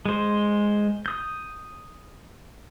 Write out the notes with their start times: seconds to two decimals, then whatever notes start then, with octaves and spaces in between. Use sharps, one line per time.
0.05 G#3 C5
1.06 D#6 G6